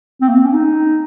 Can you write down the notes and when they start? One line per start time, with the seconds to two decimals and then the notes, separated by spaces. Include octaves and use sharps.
0.21 C4
0.29 A#3
0.37 C4
0.45 C#4
0.53 D#4